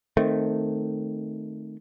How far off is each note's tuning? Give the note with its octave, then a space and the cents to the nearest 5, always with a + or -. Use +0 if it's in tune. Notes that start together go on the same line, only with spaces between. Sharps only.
D#3 -10 A3 +0 C4 +0